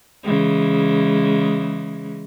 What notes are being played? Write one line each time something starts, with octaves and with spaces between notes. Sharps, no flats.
C#3 E3 G#3